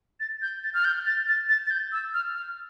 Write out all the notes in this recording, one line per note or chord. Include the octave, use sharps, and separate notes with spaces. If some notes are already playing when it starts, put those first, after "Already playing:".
A6
G6
A6
F6
G6
A6
A6
A6
A6
G6
E6
F6
F6